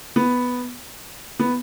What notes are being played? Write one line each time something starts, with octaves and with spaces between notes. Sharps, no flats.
B3
B3